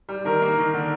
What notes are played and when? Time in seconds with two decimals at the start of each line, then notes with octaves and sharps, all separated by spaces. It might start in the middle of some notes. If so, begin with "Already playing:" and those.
0.09 G3
0.25 D#3 A#4
0.42 A#3
0.58 D#3
0.74 D3